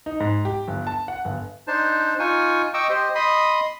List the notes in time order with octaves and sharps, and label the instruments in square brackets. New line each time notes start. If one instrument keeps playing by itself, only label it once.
[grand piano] D#4
G#2
G4
G1
A5
F#5
G1
[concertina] D4 D#4 C5 A5
D#4 F4 G#5 C#6
D#5 G5 C#6 D6 E6
G4 C5 D#5
D#5 B5 C6 D#6